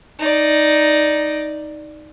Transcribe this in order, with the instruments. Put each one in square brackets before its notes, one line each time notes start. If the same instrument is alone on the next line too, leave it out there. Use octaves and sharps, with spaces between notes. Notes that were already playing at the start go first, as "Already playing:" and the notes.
[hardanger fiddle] D#4 D5